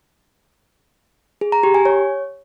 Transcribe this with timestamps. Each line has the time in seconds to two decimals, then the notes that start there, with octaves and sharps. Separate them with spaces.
1.41 G#4
1.52 A#5
1.63 G4
1.74 G#5
1.85 C#5